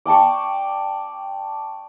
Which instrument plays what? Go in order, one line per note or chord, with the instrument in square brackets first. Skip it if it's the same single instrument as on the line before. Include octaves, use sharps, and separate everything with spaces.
[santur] D5 G5 A5 C#6